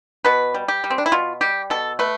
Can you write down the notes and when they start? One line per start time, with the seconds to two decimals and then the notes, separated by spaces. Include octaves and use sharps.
0.25 B2 B4
0.54 G3
0.68 G4
0.84 G3
0.90 C4
0.98 D4
1.06 E4
1.12 B2 F4
1.41 G3 G4
1.70 B2 A4
1.99 A3 B4